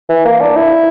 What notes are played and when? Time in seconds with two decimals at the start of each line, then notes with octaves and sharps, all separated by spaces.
0.09 E3
0.25 A#3
0.41 D4
0.56 E4